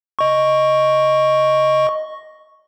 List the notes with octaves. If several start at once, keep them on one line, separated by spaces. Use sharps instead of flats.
D#5 C#6